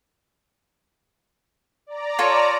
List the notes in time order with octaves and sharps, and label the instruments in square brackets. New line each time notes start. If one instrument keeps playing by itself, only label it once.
[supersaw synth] D5 A#5
[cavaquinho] F4 A4 C#5